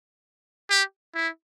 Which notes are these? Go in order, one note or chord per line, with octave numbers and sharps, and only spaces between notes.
G4
E4